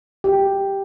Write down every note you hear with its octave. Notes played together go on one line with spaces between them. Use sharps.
G4